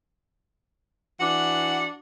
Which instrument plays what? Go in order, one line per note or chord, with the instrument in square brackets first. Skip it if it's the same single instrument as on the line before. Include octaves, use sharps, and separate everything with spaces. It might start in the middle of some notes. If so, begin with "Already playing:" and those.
[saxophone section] E3 D4 F#4 F#5